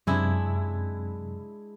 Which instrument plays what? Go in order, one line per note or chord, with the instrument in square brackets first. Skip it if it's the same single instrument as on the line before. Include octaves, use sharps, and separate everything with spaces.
[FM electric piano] F#2 C3 [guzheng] G#3 D4 E4